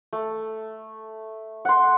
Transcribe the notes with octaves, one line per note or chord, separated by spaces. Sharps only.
A3
F#5 C6